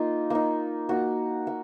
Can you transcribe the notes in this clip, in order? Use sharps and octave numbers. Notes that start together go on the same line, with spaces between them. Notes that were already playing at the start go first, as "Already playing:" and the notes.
Already playing: A#3 D#4 F4
A#3 D#4
A#3 D#4 F#4
A#3